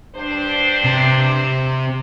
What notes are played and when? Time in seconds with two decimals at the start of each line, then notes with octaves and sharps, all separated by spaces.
0.15 G2 D4 C5
0.84 C3